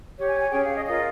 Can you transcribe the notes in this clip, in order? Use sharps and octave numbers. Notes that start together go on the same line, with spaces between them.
G4 C#5
G#5
G#5
C#4 G#4 C#5 G5
F5
D#5
F4 A#4 C#5 D#5